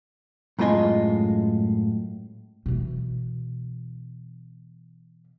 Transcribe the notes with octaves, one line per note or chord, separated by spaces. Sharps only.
F#2 A2 G#3 F4 D#5 G#5
B2 E3